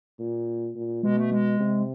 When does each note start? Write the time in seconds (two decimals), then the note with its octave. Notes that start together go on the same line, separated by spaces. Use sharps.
0.19 A#2
0.75 A#2
1.03 B2 G#3
1.17 A3
1.32 G#3
1.60 C3